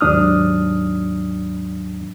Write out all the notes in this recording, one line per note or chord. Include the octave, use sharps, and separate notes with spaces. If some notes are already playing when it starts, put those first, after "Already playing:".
D#2 G#2 F#3 D4 D#6 F6